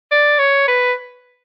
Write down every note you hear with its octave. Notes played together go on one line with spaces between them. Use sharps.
D5
C#5
B4